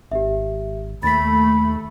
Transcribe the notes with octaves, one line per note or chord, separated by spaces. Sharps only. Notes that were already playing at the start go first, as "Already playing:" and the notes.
G#1 G4 E5
D#2 A3 B5 A6 B6